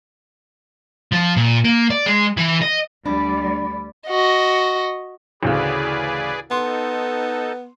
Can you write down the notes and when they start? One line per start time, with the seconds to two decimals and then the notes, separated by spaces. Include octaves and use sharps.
1.12 F3
1.36 A#2
1.65 A#3
1.90 D5
2.06 G#3
2.37 E3
2.61 D#5
3.06 D2 G3 D4 D5 B5
4.08 F#4 D#5
5.43 A1 D2 C#3 G#4 B4 D5
6.51 B3 D#4 A4 C6